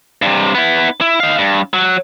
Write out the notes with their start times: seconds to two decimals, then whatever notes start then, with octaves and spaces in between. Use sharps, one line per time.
0.22 G2 C3
0.55 B3 E4
1.01 E4
1.20 D#4 F5
1.38 G2
1.74 F#3